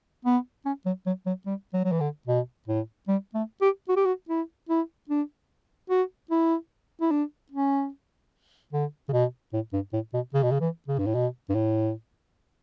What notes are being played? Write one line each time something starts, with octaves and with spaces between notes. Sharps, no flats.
B3
C#4
F#3
F#3
F#3
G3
F#3
F#3
E3
D3
B2
A2
G3
A3
G4
F#4
G4
F#4
E4
E4
D4
F#4
E4
E4
D4
C#4
D3
C#3
B2
A2
G2
A2
B2
C#3
B2
C#3
E3
C#3
G2
A2
B2
G2
A2